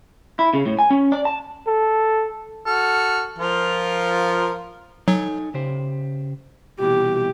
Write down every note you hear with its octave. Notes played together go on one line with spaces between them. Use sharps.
E4
C#3
A2
G#5
C#4
D5
A5
A4
F#4 A4 F6
F3 F4 A#4
F#3 D#4 A4 G#5
C#3 G4 C5
C2 B2 E3 G4